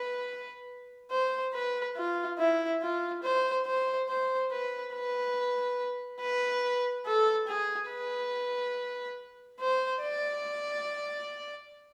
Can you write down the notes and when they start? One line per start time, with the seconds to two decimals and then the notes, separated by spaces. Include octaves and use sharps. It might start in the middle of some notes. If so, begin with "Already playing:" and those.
Already playing: B4
1.12 C5
1.54 B4
1.97 F4
2.39 E4
2.82 F4
3.24 C5
3.67 C5
4.09 C5
4.52 B4
4.94 B4
6.21 B4
7.06 A4
7.48 G#4
7.90 B4
9.61 C5
10.03 D5